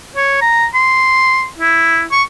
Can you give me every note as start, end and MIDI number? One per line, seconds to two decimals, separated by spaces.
0.16 0.37 73
0.42 0.66 82
0.74 1.47 84
1.59 2.04 64
2.12 2.23 85